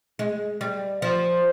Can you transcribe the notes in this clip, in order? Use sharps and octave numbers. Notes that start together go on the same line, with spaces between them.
G#3
G3
F3